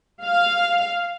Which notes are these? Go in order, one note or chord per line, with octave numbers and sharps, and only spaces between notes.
F5